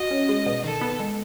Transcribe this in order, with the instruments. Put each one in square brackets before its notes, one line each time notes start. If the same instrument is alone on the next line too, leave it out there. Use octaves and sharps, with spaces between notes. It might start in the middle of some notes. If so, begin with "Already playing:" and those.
Already playing: [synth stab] F#4 [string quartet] D#5
[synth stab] C#4
G#3
B2
[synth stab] D#3 [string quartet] A4
[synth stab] B3
G#3